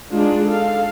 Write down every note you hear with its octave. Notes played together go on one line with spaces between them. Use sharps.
G#3 D4 D#4 F4 G#4
A4 F5